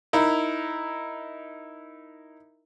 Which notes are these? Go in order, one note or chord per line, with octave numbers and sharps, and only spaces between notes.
D#4 E4 A#4